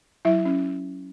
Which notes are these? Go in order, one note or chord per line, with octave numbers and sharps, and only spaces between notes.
F#3 E4 E5
C#4